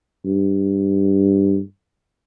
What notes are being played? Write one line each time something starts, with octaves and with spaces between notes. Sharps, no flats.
G2